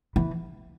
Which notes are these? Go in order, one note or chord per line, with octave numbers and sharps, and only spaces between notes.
E3